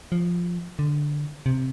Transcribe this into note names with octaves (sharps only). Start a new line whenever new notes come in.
F3
D3
C3